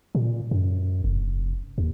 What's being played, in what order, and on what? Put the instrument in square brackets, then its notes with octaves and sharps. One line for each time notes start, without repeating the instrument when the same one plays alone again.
[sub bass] A#2
F#2
F1
D#2